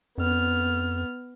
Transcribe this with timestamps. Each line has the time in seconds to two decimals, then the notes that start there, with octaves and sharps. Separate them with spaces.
0.18 F2 B3 F6